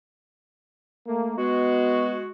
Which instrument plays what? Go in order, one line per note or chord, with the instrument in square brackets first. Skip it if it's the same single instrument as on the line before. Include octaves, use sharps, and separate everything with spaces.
[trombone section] A3 A#3
[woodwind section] G#3 F#4 [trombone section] B3